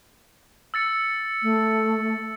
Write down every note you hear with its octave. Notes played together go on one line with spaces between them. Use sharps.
E6 A6 C#7
A3